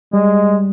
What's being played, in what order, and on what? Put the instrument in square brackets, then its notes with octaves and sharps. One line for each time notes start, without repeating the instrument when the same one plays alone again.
[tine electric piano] G3 [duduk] G#3